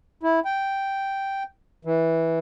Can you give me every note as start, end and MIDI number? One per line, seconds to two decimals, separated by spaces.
0.23 0.40 64
0.45 1.43 79
1.85 2.39 52